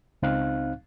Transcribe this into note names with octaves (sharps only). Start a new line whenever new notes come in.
C#2 C4 D#4 F5 F#6